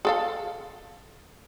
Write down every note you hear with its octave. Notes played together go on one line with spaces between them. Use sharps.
G#4 A4 F5